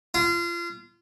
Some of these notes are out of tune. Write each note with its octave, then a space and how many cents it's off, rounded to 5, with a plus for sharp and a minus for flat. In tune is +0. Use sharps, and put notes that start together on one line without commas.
F4 -30